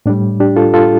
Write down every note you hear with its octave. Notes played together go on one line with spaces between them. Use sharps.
A2 G3 D4
D4 G4
F4 A4
F4 A4